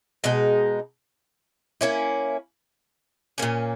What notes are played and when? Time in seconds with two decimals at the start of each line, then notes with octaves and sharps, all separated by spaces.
0.24 B2 G#3 D#4
1.81 A#3 C#4 E4
3.38 A#2 A#3 C#4